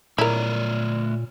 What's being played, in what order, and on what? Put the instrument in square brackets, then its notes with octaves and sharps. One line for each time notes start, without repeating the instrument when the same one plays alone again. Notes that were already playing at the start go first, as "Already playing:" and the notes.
[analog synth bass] A#2 [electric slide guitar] A3 C#5 D5 [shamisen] E4 A#4